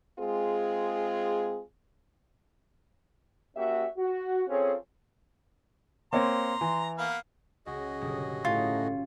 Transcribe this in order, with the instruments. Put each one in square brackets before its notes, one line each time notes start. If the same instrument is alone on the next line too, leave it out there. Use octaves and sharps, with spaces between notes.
[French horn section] G#3 C4 F4 G#4
[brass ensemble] A#3 C#4 F#4 G4 E5
F#4
C4 C#4 F4 G#4 A4 C#5
[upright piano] A#3 C4 C#5 [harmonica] A#5 C6
[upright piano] E3
[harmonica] A#3 B3 F5
[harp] C#2 [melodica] F#4 G#4 D#5
[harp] G1 B2 F#3
[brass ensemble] A2 [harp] C#4 [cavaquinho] F4